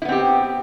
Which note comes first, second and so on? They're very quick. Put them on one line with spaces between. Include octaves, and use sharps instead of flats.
E4 B3 C4 G4